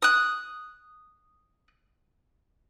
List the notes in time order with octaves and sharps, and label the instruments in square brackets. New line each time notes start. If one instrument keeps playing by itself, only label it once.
[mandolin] D#6 F#6